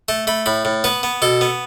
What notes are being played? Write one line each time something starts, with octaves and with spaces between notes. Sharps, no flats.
A3 A5
A3 B5
A2 B5
A2
B3 B4
B3
B2 A4
B3